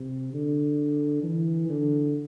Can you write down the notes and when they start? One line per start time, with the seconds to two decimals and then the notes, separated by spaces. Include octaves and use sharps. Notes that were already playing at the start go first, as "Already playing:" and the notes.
Already playing: C3
0.33 D3
1.23 E3
1.69 D3